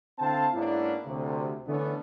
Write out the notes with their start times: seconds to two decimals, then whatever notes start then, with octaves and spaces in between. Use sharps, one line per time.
0.19 D3 C4 E4 C5 F5 A5
0.54 G#2 A#3 B3 C#4 D4 E4
1.06 D2 C3
1.67 D3 E3 A3 B3 C#4 D4